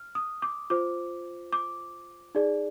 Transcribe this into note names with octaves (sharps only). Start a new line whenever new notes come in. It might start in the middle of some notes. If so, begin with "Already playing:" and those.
Already playing: F6
D#6
D6
F4 C5 D6
D6
D#4 G#4 D5